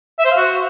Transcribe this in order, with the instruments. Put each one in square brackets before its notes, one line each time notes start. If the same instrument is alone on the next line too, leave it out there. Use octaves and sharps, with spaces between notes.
[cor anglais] E5
C5
F5
F#4